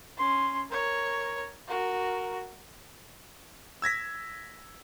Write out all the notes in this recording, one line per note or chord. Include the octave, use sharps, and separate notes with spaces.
C#4 C6
A#4 C#5
F#4 A#4
E6 G#6 A#6 B6